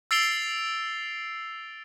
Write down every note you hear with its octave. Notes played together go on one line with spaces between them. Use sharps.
E6 A6 C7 D7 F7 G7